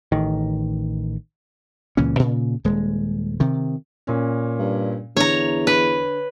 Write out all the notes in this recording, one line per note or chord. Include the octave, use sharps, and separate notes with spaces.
A1 D#3
C#2 A#2 E3 C#4
A#2 C#3
D#1 G#3
C3 D#3
A#2 C#4
G2
E2 D3 C#5 A#5
B4